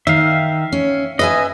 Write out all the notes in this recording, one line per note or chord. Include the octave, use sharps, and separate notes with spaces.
D#3 E5 F5
C#4
B4 D#5 E5 G#5